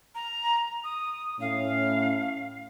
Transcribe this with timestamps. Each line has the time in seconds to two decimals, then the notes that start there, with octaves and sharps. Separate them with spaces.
0.15 A#5
0.84 D#6
1.41 A2 C#4 F5